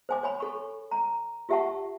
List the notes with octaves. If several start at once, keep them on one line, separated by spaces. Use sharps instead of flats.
C5 G#5 D6
C#5 G#5 B5
A4 C#6
A#5
F4 G4 E5 F#5 A5 C#6